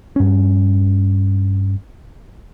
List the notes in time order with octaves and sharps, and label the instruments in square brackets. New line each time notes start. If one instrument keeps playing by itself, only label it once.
[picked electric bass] G2 C#4